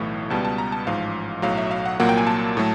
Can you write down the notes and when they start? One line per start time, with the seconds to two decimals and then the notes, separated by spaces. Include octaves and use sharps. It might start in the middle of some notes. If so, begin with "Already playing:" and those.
Already playing: B1 A2 E3 A3
0.30 C#2 B2 G3 B3 A5
0.45 A5
0.58 A#5
0.72 A5
0.87 A1 G#2 F3 F5
1.42 B1 A2 F#3 F5
1.57 E5
1.71 F5
1.86 F#5
2.00 C2 A#2 F#3 A#3 F#5
2.09 G5
2.18 G#5
2.27 A5
2.57 A2 F#3 A3